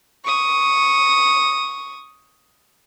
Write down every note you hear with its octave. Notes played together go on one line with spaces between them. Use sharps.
C#6 D#6